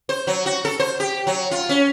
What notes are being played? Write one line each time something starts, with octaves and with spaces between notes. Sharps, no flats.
C5
F#3
F#4
A4
C5
G4
F#3
F4
C#4